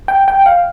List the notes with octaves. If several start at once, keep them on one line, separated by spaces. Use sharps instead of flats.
G5
G5
F5